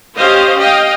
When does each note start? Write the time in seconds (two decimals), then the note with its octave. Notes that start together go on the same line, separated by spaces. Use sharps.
0.16 C#4 G4 C5 D#5 F5
0.59 D#5 F5 G5